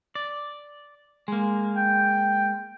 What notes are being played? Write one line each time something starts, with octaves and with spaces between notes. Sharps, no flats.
D5
G#3 A#3
G5